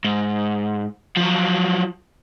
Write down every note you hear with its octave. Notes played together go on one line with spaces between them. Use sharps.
G#2
F3 F#3